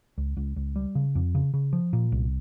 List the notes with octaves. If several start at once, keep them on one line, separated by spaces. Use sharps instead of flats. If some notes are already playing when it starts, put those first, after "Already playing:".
C#2
C#2
C#2
G3
C#3
F2
C#3
C#3
F3
A#2
C2